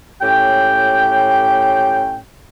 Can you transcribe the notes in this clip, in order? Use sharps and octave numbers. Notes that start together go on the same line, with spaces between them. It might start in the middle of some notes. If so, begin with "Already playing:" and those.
A2 C#4 G4 G5